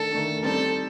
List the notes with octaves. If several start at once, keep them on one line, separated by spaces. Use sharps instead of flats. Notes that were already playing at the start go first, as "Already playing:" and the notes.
Already playing: D#3 A3 D4 A4
D#3 A3 D4
G3 C4 D#4 A4